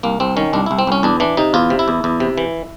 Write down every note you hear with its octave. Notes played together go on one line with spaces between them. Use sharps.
C2 A#3
C2 C4
D#3 C#4
C2 D4
C2 E4
C4
C2 C#4
E2 D4
E3 D4
C3 D#4
E2 F4
C3
E4
E2
E2
C3
E3